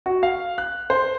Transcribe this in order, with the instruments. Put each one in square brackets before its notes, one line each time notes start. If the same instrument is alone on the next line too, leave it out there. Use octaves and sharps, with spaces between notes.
[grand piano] F#4
F5
F#6
C5